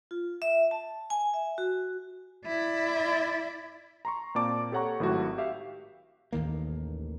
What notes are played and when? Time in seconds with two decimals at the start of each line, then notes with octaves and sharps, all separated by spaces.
0.11 F4
0.42 E5
0.71 A5
1.10 G#5
1.34 E5
1.58 F#4
2.46 E4 D5
4.05 A#5 C6 C#6
4.35 A#2 A#3 C4 D5 A5 D6
4.72 G4 A4 C#5 F#5 A#5 C#6
5.00 G#1 A2 F#3 F#4
5.38 G4 E5 F5
6.32 A1 D#2 D#3 A#3